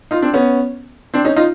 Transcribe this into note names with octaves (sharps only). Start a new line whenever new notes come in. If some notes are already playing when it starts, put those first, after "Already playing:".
D#4 F4
C4 D4
B3 C#4
C4 D4
C#4 D#4
D#4 F4